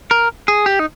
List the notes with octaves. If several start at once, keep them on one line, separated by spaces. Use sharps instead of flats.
A#4
G#4
G4
D#4